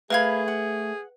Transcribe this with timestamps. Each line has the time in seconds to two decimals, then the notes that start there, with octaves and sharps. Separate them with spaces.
0.10 A3 G#4 A#4 B4 F5 B5 G#6
0.48 F#5